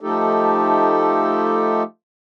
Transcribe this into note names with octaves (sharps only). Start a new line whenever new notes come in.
F3 A3 D#4 G4 A4